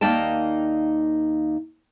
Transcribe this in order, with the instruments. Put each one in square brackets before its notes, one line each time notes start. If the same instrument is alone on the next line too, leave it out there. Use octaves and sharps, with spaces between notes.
[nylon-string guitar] D#2 A#3 D#4 D5 G5 A5